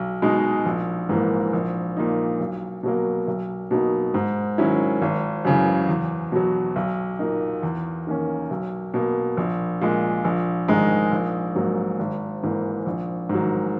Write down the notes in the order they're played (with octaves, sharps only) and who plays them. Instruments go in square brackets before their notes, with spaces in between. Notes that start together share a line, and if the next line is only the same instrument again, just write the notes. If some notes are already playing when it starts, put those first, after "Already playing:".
Already playing: [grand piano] B1
B2 G#3 D#4
A#1
G#2 E3 A#3
A#1
A#2 A#3 D#4
B1
B2 F#3 A#3
B1
B2 F#3 A#3 D#4
G#2
D#3 F#3 C#4 E4
G#1
F#2 C#3 E3
E2
B2 F#3
B1
A#2 A#3 D#4
E2
D#3 A#3 C#4
B1
B2 A#3
A#1
A#2 G#3
A#1
G#2 D#3 G#3 D#4
A#1
G#2 F#3 A#3
G#1
G#2 E3 A#3
A#1
G#2 D#3 F#3